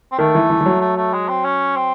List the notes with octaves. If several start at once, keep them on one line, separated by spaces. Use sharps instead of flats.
C4
D#3 A3
E3
E3
E3
F#3
A3
A3
G#3
C4
C#4
C4